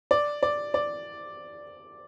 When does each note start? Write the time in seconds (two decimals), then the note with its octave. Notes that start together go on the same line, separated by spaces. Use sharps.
0.11 D5
0.43 D5
0.74 D5